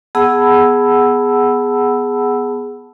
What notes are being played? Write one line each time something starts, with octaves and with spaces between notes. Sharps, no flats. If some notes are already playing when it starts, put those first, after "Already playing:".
B3 G#4 F#5 A5 B5 E6